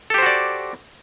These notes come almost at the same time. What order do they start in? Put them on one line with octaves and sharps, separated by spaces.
A4 G4 C5 F#4 D5